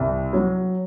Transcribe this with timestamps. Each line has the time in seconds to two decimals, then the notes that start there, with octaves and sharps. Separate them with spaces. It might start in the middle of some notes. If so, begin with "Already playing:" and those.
Already playing: C2
0.33 F#3